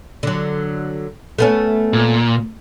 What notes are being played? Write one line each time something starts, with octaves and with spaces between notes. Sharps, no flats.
D3 F#3
A3 B3 C#4
A#2